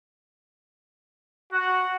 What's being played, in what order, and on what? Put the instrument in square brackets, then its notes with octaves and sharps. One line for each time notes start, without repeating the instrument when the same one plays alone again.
[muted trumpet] F#4 [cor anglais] F#5